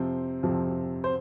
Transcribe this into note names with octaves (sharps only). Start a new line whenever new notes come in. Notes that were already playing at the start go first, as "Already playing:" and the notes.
Already playing: F2 C3 F3 C4 C5
F2 C3 F3
C5